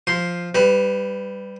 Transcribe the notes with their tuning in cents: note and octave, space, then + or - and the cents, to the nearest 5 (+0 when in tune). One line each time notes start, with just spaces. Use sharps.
F3 +0 C6 +0
G3 +0 B4 +20